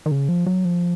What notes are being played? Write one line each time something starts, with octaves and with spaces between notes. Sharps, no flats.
D#3
C#3
F3
F#3
F3